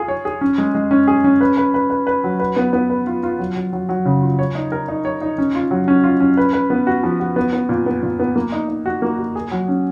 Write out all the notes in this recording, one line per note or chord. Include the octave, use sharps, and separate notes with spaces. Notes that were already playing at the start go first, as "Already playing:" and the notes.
Already playing: F4 G#4
C#5
G#4
C#4
G#3
G#3
C#4
G#4
C#4
B4
B4
B4
B4
B4
F#3
B4
B3
B3
B4
F4
F4
F#3
F#3
F#3
F#3
C#3
F4
C#5
D#4
A#4
D#4
C#5
D#4
C#4
F4
F#3
C#4
F4
C#4
B4
B4
B3
F#4
F3
F#4
B3
B3
A#2
B3
A#2
B3
A#3
D#4
D#4
F#4
A#3
F#4
G#4
F#3
C#4